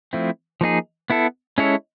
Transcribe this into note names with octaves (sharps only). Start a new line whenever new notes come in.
F3 A3 C4 E4
F3 A#3 D#4 G#4
B3 E4 A4
G#3 C#4 E4 A4 C#5